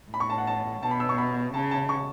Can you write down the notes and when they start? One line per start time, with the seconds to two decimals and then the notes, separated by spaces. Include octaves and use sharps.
0.11 A2 B5
0.20 C#6
0.30 A5
0.38 F#5
0.47 A5
0.83 B2 A5
0.91 B5
1.00 E6
1.09 C#6
1.18 B5
1.54 C#3 A5
1.71 A5
1.89 C#6